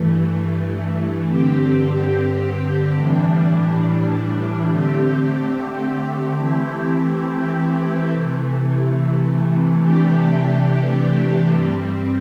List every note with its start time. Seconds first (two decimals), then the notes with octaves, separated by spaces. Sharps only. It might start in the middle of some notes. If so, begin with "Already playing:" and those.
Already playing: G2 E3 A3
1.24 G2 D3 C4 G4
2.95 A2 E3 G3 D4
4.66 D3 A3 C4 G4
6.36 E3 A3 C4 E4 G4
8.07 C3 E3 A3
9.78 C3 E3 A3 D4 G4
11.49 G2 G3 C4